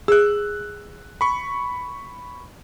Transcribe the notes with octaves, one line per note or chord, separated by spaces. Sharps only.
G#4 E6 F#6
B5 C#6